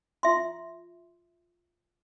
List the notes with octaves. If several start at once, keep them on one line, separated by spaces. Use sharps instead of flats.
F4 E5 C6